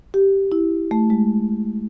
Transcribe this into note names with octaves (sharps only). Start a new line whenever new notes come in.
G4
E4
A3
G#3